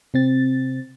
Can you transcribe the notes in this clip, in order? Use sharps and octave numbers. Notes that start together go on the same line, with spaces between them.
C3 C4 A6